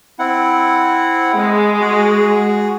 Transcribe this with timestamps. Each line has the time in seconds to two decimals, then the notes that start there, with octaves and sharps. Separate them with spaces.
0.19 C4 E4 F#5
1.33 G#3
1.80 F#4 G#4